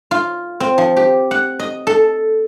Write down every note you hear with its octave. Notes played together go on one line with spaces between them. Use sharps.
F4
C4
F3
G4
F#5
D#5
A4